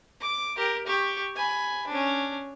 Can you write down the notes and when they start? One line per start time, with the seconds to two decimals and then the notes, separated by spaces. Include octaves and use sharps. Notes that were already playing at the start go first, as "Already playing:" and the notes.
0.21 D6
0.57 G4 A#4
0.87 G4 C#6
1.36 G#5 B5
1.87 C#4 D4